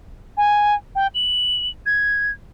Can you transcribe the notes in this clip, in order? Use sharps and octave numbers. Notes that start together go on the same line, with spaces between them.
G#5
G5
F#7
G#6